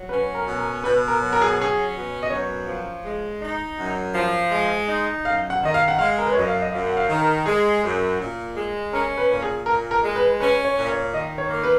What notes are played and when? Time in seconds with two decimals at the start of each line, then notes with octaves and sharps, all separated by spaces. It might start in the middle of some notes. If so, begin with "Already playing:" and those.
Already playing: F#3
0.09 C#4 B4
0.35 A#4
0.46 B2
0.58 A#4
0.83 B2 B4
1.08 A#4
1.20 F#3
1.33 A#4
1.41 G#4
1.57 C#4 G#4
1.94 B2
2.23 D#5
2.30 F#2 C#5
2.67 F3
3.04 G#3
3.41 D#4
3.78 F#2
4.15 F3
4.51 G#3
4.88 D#4
5.25 F#2 F5
5.50 F#5
5.62 D#3 D#5
5.74 F5
5.88 F#5
5.99 G#3 F5
6.18 A#4
6.26 B4
6.33 C#5
6.36 F#2 D#5
6.47 F5
6.62 D#5
6.72 F#2 F5
6.87 F#5
6.97 F5
7.09 D#3
7.21 A#4
7.46 G#3 G#4
7.82 F#2
8.19 A#2
8.56 G#3
8.93 C#4 A#4
9.18 B4
9.30 A#2
9.42 G#4
9.66 A#2 A#4
9.91 A#4
10.03 G#3
10.16 B4
10.40 C#4 B4
10.65 C#5
10.77 A#2
10.90 C#5
11.14 D#3 D#5
11.38 C#5
11.50 A#3
11.64 B4